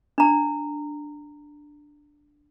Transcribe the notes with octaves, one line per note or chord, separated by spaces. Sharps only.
D4 A#5